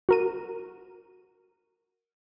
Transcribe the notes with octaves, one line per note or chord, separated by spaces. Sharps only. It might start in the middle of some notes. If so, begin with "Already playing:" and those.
F#4 A#4 D#7